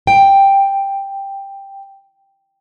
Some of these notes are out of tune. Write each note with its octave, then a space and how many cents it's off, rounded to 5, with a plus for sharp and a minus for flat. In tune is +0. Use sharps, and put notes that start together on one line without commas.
G5 +5